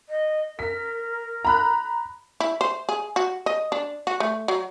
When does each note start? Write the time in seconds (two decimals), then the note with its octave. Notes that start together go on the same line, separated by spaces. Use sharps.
0.09 D#5
0.59 A#4 B6
1.45 A#5 B5 F#6
2.40 E4
2.61 C5
2.89 G#4
3.16 F#4
3.46 D#5
3.72 D4
4.07 F#4
4.20 A3
4.48 F#3